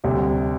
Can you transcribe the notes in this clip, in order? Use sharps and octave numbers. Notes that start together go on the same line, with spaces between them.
D2 C3 G3